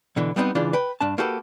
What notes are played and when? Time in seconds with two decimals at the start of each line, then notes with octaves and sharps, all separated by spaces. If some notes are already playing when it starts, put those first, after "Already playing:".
0.16 B2 D3 E3
0.36 G3 B3 C4 D4 D#4
0.55 C#2 C#3 E3 D4 F4 D5
0.73 B4 G5
1.01 G2 D4 A5
1.18 A#3 F#4 G4 A4 B4